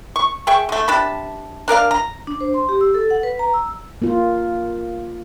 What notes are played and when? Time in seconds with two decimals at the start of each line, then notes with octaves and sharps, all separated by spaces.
0.16 C#6
0.47 G#4 E5 G5 C#6
0.69 D3 A3
0.88 C3 D4 A5 B5
1.68 D4 A#4 D5 F5
1.91 A#5
2.27 D4
2.41 C5
2.54 C6
2.69 G4
2.81 E6
2.94 A4
3.11 F#5
3.23 B4
3.39 A#5
3.54 E6
4.02 A#3 F4